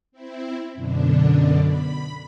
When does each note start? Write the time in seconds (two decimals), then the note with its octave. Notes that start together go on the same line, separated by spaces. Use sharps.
0.12 C4 E4
0.74 F#2 B2 D3 D4
1.61 B5